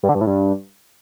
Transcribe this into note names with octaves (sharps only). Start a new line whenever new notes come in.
G2
D3
G2
A2
G2